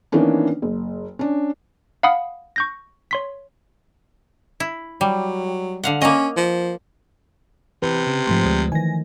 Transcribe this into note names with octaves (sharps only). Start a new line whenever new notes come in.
D#3 E3 A#3 B3 C#4 D4
F#1
C#4 D4
F5 F#5 B5 D#6
C#6 G6 A#6
C#5 C6 B6
E4
F#3 G3
D3 F5 F#5
A#3 C#4 D#5
F3
C3 E3 B4
C#3
G#2 F3 A3 C6
D2 G#3
D#3 E3 G#5 A#6